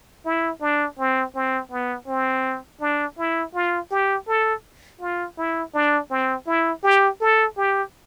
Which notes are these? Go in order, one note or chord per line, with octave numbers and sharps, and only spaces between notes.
E4
D4
C4
C4
B3
C4
D4
E4
F4
G4
A4
F4
E4
D4
C4
E4
G4
A4
G4